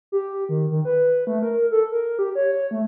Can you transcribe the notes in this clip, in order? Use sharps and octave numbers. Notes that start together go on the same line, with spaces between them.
G4
D#3
D#3
B4
A3
A#4
A4
A#4
G4
C#5
C#5
A3